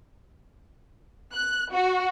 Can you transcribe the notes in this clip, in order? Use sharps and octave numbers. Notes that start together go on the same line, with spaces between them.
F#6
F#4